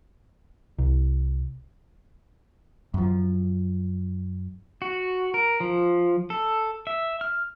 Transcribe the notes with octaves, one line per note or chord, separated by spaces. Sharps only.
C2
F#2 F3
F#4
A#4
F3
A4
E5
F6